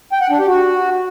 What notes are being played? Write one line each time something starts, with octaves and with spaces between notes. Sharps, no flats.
G5
F#5
D4
G4
F#4